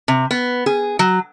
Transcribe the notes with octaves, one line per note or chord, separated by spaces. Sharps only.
C3
B3
G#4
F#3